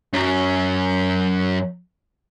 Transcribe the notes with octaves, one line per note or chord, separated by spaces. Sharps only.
F#2 F#3